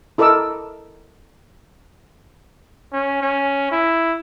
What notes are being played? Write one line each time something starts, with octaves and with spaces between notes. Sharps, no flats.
E4 A4 A#4 D#5 D6 E6
C#4
C#4
E4